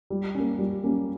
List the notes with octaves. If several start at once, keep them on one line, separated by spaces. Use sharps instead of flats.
G3
A#3 C#4
G3
A#3 C#4